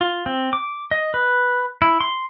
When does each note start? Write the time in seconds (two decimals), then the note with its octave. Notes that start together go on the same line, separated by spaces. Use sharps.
0.01 F4
0.26 C4
0.53 D6
0.91 D#5
1.14 B4
1.82 E4
2.01 C6